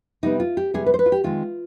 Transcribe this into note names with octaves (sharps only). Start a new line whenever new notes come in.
C3 G3 B3 D#4
F4
G4
C3 G3 B3 G#4
B4
C5
B4
F4
G4
D#3 G#3 C4 F4